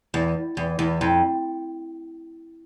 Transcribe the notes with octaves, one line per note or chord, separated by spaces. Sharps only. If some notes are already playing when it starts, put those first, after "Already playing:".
E2
E2
E2
F2